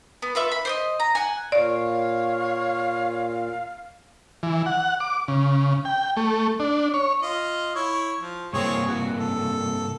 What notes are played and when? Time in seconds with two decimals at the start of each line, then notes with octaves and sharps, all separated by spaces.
0.22 B3
0.35 F4 B4 E5 C#6
0.52 B5
0.65 C5 D5 D#5
1.00 A#5
1.15 F#5 G#5
1.52 A#2 C#5 D5 F5
4.43 E3
4.66 F#5
5.00 D6
5.28 C#3
5.85 G5
6.17 A3
6.60 D4
6.94 C#5
7.22 F4 D#5
7.75 E4 C#5
8.20 F3
8.53 G2 C3 A#3 C4 G#4 C#5
8.87 F#4
9.19 A4